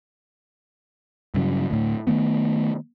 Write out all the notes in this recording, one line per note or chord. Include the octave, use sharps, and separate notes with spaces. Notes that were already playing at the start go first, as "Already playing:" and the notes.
G2 C#3 F#3
D2 A2
D#3 A3 B3